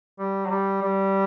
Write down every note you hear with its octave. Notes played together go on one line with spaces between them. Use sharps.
G3
F#3
G3
G3